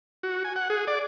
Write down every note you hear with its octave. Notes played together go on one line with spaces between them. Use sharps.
F#4
G#5
F#5
G#4
D5